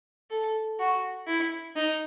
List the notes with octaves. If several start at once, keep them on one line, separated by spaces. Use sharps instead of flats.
A4
F#4
E4
D#4